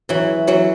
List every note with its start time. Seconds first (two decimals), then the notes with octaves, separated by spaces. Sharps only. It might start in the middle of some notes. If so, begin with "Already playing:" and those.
0.09 E3 F#3
0.47 E3 F#3